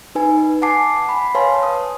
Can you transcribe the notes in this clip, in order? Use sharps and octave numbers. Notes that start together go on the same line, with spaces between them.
D#4 B4 G#5
F#5 G#5 A5 D6 C7
B5
B4 C#5 F5 G#5 A5 C6
D#6